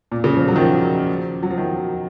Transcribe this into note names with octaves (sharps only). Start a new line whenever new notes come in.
A#2
C#3
F3
F#3
D#3
F3
F#3
F3
D#3